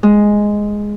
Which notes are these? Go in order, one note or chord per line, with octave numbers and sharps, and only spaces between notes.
G#3